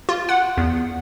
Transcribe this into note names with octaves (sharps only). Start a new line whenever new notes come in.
F4
F#5
E2